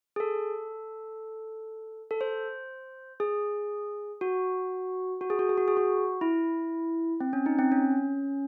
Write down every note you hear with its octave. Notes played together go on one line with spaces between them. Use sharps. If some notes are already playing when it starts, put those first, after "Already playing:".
G#4
A4
A4
C5
G#4
F#4
F#4
G#4
F#4
G#4
F#4
G#4
F#4
E4
C4
C#4
D#4
C4
C#4